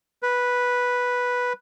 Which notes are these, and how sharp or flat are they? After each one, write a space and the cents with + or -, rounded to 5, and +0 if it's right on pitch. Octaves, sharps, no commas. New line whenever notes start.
B4 -5